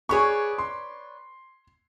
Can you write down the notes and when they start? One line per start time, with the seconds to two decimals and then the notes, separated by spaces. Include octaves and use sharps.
0.09 G#4 B4 C#5 D5 C#6
0.58 C6